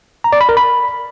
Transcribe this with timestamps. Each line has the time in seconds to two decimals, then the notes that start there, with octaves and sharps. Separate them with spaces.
0.24 A#5
0.32 D5
0.41 B5
0.49 A#4
0.57 B5